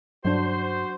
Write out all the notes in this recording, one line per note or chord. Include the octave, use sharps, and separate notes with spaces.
G2 F#3 D4 F#4 C5